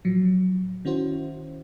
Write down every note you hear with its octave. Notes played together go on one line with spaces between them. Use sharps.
A2 F3 F#3
D#3 C#4 E4 F#4 C5